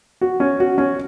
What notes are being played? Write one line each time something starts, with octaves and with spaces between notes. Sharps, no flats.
F#4
C#4
F#4
C#4